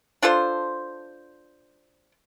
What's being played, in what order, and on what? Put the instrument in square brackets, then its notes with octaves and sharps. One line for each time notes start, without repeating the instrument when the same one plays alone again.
[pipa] D4 F4 A4 C5